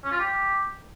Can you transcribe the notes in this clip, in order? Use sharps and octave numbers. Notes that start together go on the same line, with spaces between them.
C#4
F4
G4